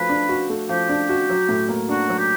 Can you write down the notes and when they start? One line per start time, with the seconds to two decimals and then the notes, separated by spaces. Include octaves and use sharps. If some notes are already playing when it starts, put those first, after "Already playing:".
Already playing: F3 A3 F#4 B4
0.09 D4
0.29 F#4
0.49 A3
0.69 F3 G4
0.89 D4
1.09 F#4
1.30 F#3
1.49 A2
1.69 A#3
1.89 D4 F#4
2.09 F#3
2.19 G4